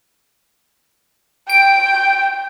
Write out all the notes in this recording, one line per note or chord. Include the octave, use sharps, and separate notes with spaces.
G5 D7